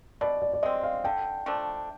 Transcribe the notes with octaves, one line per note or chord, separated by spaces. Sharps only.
B2 D5
D5
D5
G#3 C4 D#5
F5
D3 G5
F3 A3 D4